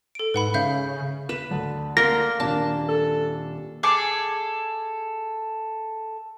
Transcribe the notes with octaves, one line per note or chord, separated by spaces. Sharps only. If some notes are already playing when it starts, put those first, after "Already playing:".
A4 D7
G#2 B4 F#5 B5
C#3 E5 F5 G6
B4 E7
D2 A5
A#3 A#4 C6 A#6
D#1 D4 A5
A4
G#4 A4 D6